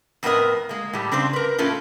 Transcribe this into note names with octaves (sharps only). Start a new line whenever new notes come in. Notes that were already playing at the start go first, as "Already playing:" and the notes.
F2 A2 B3 C4 A#4 D#5
G#3 A#3
A2 G3
C#3 C4 D4 C5
A#4 B4
A2 A3 A#3 C#4 F4